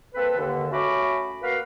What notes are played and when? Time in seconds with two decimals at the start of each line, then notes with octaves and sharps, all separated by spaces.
0.15 A#3 C4 A4 B4
0.37 D#2 D3
0.71 A3 C#4 F#4 B5 D6
1.43 A#3 F#4 A#4 B4 F5